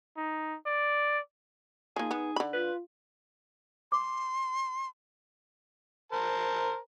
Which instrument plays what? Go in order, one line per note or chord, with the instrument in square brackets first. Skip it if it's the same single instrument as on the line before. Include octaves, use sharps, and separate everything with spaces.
[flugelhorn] D#4
D5
[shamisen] F3 A#3 [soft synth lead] D#4 [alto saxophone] G#4
[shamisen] B3
D3 B5
[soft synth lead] F4 [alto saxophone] B4
[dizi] C6 [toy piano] D6
[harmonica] A#4 C5 A5